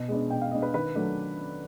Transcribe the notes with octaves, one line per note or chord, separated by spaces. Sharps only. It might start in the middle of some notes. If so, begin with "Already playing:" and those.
Already playing: B2
G#3 B3 D4
B2 G5
F5
G#3 B3 D4 D#5
B4
D#3 B4
F#3 A3 D4